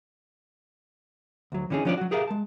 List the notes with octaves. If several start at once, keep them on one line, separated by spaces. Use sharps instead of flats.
D2 F#3
D3 E3 C#4 D#4 G#4
F3 F#3 C#4 D4 F4 D5
F#3 F#4
G4 G#4 A#4 C#5 E5 F5
G#3 A5